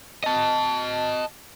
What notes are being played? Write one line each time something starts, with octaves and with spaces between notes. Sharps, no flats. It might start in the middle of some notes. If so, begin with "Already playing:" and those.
D#5 A5